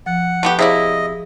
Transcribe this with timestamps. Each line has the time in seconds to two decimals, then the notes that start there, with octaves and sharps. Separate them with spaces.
0.06 F3 F#5
0.43 A3 B3 G4
0.59 C3 E4 G#4 D5 D#5 F5